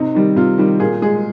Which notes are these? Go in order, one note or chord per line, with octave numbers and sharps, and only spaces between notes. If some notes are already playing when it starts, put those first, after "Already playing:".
Already playing: C3 D#4
D#3 G3
C3 F4
D#3 G3
A#2 G#4
G#3 G#4